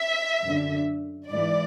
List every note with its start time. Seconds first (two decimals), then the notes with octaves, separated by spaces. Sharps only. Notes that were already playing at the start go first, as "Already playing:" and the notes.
Already playing: E5
0.43 F#2 D3
1.28 G#2 E3 D5